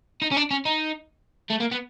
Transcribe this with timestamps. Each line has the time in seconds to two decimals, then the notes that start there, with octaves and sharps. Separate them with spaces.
0.22 D#4
0.32 C#4
0.37 D4
0.51 C#4
0.66 D#4
1.50 A3
1.60 A#3
1.72 B3